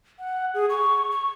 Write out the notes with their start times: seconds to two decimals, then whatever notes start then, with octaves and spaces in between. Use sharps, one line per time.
0.19 F#5
0.54 G#4
0.69 C#6
1.11 C#6